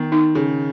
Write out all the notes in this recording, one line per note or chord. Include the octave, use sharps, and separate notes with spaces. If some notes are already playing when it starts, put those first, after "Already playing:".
Already playing: D#3 B3
D#4
C#3 G#4